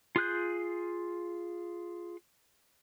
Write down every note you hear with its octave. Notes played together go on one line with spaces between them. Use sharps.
F4 G#4 F#6 G6